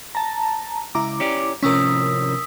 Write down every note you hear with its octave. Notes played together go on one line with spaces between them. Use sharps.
A5 A#5
C#2 E4 A#5 D6
C#4 G4 D5
A2 C3 F3 C#4 A#4 D#6 E6 B6